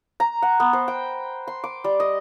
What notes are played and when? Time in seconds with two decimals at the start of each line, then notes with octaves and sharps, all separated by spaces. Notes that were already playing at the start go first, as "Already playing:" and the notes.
0.20 A#5
0.42 F#5
0.60 B3
0.73 C5
0.88 G5
1.47 C6
1.64 D6
1.84 G3
2.00 D#5